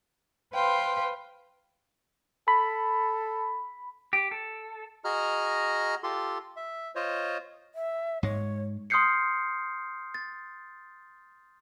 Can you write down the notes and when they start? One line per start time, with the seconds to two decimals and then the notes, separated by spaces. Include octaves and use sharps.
0.53 B4 C5 F5 G5 C6
2.48 A4 B5
4.13 G4
4.31 A4
5.05 F#4 G#4 D#5 A#5 F6
6.03 F4 G4 A4 C6
6.56 E5
6.95 F4 C5 C#5 D#5
7.75 E5
8.23 G#2 G#3 C#5
8.90 C6 D#6 F6 G6 C7 C#7
10.14 A6